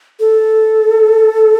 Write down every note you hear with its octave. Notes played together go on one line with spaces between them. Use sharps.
A4